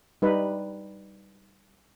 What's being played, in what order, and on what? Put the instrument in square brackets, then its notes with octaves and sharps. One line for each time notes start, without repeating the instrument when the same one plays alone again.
[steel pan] G3 D#4 B4